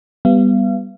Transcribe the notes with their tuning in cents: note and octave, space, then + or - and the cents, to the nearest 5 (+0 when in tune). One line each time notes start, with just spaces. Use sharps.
G3 +5 B3 +0 F5 -40